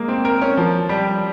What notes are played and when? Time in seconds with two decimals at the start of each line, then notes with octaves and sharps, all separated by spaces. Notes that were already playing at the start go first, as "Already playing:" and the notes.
Already playing: G#3 A#3
0.08 C4
0.25 A#4
0.42 C#4
0.57 F3
0.89 G3